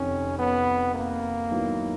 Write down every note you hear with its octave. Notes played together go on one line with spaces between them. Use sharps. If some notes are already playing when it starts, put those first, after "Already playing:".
Already playing: F2 C3 D#3 C#4
B3
A#3
G#2 D#3 F#3 B3 E4